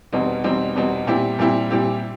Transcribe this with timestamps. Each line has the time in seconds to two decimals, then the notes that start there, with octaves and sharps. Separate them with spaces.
0.13 E2 B2 G3 C4 D#4
0.44 E2 B2 G3 C4 D#4
0.76 E2 B2 G3 C4 D#4
1.07 A#2 G3 C4 E4 G4
1.39 A#2 G3 C4 E4 G4
1.70 A#2 G3 C4 E4 G4